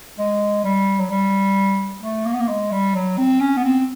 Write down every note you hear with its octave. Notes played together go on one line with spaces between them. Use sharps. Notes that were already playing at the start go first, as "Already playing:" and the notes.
G#3
G3
F#3
G3
A3
A#3
B3
A#3
G#3
G3
F#3
C4
C#4
B3
C4